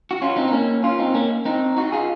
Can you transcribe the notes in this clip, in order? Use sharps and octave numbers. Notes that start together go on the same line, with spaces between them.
F#4
C#4 F4
C4 D#4
D#4
A#3 C#4
C#4 F4
C4 D#4
A#3 C#4
C4 D#4
D#4 F#4
F4 G#4